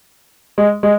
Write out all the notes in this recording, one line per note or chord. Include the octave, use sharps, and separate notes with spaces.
G#3
G#3